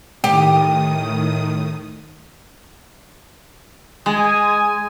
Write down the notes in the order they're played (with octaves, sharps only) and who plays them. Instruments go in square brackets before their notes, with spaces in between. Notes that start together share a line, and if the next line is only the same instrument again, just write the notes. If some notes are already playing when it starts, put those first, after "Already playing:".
[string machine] A2 D#3 D#6 [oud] G4
[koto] G#3 [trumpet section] G#5 D#6